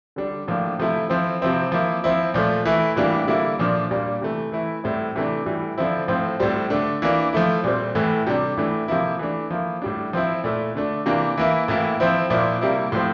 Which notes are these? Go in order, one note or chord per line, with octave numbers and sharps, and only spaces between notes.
D3 G3 D4
A2 F3 A#3 D4
C3 F3 A3 E4
F3 C4 E4
C3 F3 C4 E4
F3 A#3 E4
F3 C4 E4
A#2 F3 A3
E3 A3 E4
A2 E3 G3 A#3 D4
D3 G3 A#3 E4
A#2 F3 A#3 D4
A#2 G3 A#3 D4
C3 E3 A3
E3 A3 E4
A2 G3 C4 E4
C3 E3 A3 D4
A2 E3 G3
D3 F3 C4 E4
A2 F3 C4
A2 G3 C4
D3 A3 D4
E3 A#3 D4
F3 A3 E4
A#2 G3 C4
A2 E3 A3
C3 G3 D4
A2 E3 A3 D4
C3 F3 A#3 E4
E3 A3 D4
F3 A#3 E4
A2 G3 D4
F3 C4 E4
A#2 A3 E4
D3 A3 D4
C3 E3 A#3 D4
E3 A#3 E4
A2 E3 A#3 E4
F3 C4 E4
A#2 F3 A#3 E4
C3 G3 A#3 E4
A2 F3 C4